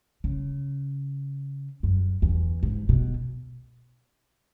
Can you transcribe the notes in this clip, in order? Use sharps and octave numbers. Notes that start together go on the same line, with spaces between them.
C#3
F#2
E2
G#2
B2